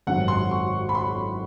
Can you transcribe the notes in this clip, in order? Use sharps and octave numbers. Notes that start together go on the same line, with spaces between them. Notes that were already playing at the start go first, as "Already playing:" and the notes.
G#1 F#2 D#3 F#5
C6
C#6
B5
C6